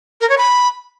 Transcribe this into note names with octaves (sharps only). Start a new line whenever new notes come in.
A#4
C#5
B5